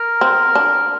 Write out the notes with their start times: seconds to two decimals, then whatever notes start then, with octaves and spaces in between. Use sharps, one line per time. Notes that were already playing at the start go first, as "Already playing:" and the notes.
Already playing: A#4
0.21 C4
0.55 D4